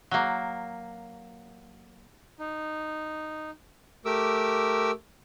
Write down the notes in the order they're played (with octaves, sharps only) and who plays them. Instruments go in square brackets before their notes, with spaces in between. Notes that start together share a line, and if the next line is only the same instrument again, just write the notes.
[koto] F#3 A#3
[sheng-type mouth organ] D#4
A3 G4 A#4 D6 E6